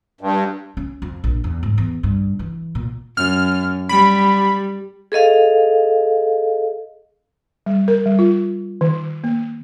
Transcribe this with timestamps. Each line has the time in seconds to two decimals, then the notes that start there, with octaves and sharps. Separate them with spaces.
0.21 G2
0.77 C#4
1.02 F2
1.24 A#1
1.44 E2
1.63 G#2
1.78 E2
2.03 G2
2.39 E3
2.75 A#2
3.17 F#2 F6
3.89 G3 B5
5.12 G#4 A4 D#5 F5
7.66 G3
7.88 A#4
8.06 G3
8.19 F4
8.81 D#3
9.24 A#3